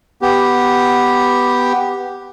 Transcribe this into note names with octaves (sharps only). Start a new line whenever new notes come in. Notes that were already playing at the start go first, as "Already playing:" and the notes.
B3 G4